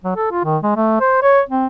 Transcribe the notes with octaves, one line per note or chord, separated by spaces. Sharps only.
F#3
A4
F4
D#3
G#3
A3
C5
C#5
C4